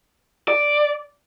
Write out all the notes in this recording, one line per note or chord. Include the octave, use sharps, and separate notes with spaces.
D5